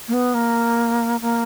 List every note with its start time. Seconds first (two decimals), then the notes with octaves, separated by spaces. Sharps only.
0.08 A#3
0.13 B3
0.34 A#3
1.21 A#3